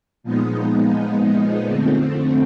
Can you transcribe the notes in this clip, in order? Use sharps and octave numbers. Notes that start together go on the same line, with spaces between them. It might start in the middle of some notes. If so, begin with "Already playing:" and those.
A#2 F3 G#3 B3 D#4
F2 D3 F3 A3 C4